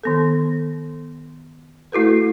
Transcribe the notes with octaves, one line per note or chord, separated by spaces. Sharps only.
D#3 B3 A4
A3 E4 F#4 A4 B4